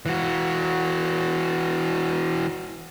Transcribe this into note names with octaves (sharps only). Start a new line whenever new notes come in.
E3 F#4